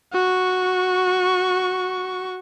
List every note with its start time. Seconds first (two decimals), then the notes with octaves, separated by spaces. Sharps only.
0.13 F#4 C#6